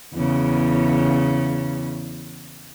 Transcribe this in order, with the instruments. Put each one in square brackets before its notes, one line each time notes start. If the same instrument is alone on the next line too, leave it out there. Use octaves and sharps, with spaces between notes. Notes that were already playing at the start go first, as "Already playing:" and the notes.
[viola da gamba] E2 C#3